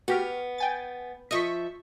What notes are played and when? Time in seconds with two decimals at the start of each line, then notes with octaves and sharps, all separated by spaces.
0.08 B3 F#4 G4 F6
0.58 G5 G#5 A6
1.31 F3 D#5 E5 C#6 B6